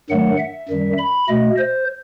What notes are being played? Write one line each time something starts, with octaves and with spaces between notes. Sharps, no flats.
G2 D#3 F#3 A3 F#5
E5
F#2 D#3 G3
B5
B2 A3 D#5
C5